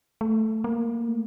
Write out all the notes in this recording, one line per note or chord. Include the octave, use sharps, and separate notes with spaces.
A3
A#3
A3